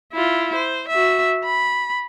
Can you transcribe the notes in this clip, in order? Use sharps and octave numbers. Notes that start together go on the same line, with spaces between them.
E4 F4
C5
F#4 E5
B5